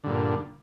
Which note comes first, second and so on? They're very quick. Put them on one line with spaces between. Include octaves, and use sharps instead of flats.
D3 G2 A#2